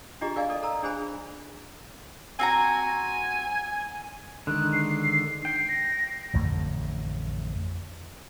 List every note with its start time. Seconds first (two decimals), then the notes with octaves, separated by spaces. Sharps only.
0.21 D4 F4 G4 G#4 D#5 A#5
0.36 A#4 D5 D#5 F5 G#5
0.50 A4 D5 D#5
0.63 A4 A#5 E6
0.83 D4 G#4 C5 G#5 B5
2.39 C4 F#4 G#5 A#5
4.47 D3 D#3 G#3 F#6
4.73 C7
5.45 G5 C7
5.69 A#6
6.33 A1 F2 D3 A3